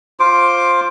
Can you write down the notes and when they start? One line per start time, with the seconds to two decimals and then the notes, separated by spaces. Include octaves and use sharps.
0.20 F4 C5 D6